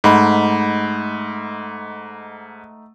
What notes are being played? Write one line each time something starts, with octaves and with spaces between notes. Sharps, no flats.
G#2 A3 D#4 F#5 B5